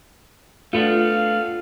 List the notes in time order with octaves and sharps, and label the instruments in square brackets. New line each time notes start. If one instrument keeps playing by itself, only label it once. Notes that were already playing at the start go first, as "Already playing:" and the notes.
[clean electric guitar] A3 B3 D4 [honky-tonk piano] F4 [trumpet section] F5